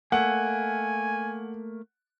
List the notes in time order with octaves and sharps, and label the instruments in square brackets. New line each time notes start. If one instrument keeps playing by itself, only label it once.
[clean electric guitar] A3 A#3 [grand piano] F#5 [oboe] G#5